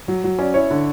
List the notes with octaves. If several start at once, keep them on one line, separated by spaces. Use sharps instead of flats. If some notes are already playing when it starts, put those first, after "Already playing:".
F#3
F#3
C#4 D5
E4 C#5
D3